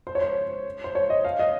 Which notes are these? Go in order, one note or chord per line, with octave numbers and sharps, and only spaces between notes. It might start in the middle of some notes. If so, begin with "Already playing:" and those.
C5
C#5
C5
C5
C#5
D#5
F5
D#5